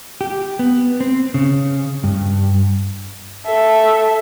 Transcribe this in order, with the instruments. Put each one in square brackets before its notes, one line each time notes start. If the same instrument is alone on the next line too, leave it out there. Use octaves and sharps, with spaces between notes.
[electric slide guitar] G4
B3
C4
C#3
G2
[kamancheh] A4 E5